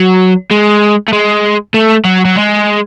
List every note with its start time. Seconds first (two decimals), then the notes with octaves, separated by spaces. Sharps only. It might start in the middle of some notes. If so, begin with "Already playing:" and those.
Already playing: F#3
0.51 G#3
1.08 A3
1.13 G#3
1.74 A3
2.05 F#3
2.25 F#3
2.36 G#3